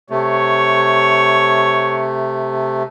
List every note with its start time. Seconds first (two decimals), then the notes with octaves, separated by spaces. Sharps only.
0.10 C3 A3 C#5